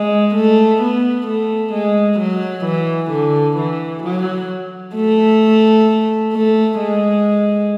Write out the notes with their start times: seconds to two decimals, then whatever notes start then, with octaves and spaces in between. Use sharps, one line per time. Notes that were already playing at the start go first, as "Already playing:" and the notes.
Already playing: G#3
0.36 A3
0.82 B3
1.28 A3
1.74 G#3
2.19 F#3
2.66 E3
3.11 D3
3.58 E3
4.04 F#3
4.96 A3
6.33 A3
6.79 G#3